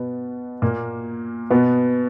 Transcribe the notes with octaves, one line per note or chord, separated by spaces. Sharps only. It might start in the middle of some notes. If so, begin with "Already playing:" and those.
Already playing: B2 B3
A#2 A#3
B2 B3